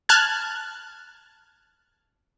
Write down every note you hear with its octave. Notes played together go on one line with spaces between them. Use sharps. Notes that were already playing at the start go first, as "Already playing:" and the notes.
A5 F6 F#6 G#6